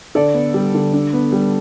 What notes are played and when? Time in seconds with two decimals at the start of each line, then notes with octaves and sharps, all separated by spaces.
0.15 D3 A4 D5
0.34 B3
0.54 G3
0.75 D3
0.93 D4
1.13 B3
1.32 G3